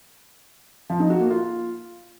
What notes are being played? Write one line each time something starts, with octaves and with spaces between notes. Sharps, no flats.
F3
D#4
F#4
A#3
F4